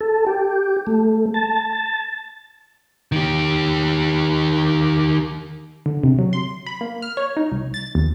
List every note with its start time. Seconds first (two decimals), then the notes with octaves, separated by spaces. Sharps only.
0.01 A4
0.26 G4
0.87 A3
1.34 A5
3.12 D#3 G4
5.86 D3
6.03 C3
6.19 F#3
6.33 C6
6.66 B5
6.81 A#3
7.02 F6
7.17 C#5
7.37 D#4
7.52 C2
7.74 A6
7.95 D#2